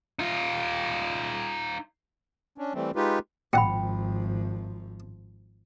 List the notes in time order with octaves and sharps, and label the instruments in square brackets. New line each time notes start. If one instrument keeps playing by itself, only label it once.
[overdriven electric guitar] D#4 F4
[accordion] C#4 D4
E3 G3 A3 C4
G#3 D#4 F4 G4 B4
[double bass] G#1 F3 [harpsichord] A#2 F#5 [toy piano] G5 B5